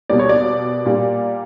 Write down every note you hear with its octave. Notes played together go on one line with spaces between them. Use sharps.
B2 G3 A#3 D5
C#5
D5
A#2 G3 A#3